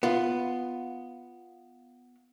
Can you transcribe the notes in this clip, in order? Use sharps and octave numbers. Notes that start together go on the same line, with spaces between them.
B3 F4